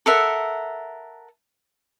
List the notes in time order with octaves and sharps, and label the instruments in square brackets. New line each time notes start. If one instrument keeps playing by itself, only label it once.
[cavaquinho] A4 A#4 E5 F#5